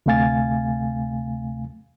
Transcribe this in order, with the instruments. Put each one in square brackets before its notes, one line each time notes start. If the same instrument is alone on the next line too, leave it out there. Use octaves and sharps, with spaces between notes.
[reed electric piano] D2 C3 A3 F5 G#5 A6